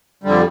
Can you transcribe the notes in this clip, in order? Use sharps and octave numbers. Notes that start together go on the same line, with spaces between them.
F2 D3 G3